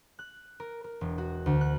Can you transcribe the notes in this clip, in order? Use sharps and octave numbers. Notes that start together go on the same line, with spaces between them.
F#6
A#4
A#4
E1
F#4
D2
F#6